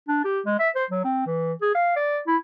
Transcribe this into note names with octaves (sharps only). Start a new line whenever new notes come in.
D4
G4
G#3
E5
C5
F#3
C4
E3
G#4
F5
D5
E4